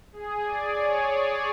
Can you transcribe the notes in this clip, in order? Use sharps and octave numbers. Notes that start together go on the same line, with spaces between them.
G#4
D5
C#5